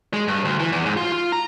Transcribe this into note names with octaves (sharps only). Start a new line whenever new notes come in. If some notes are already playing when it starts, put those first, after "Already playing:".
G#3
G2
D2
E3
E2
G#2
F4
F4
A#5